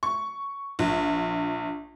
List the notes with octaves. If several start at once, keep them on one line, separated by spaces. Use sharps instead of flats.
C#6
A#1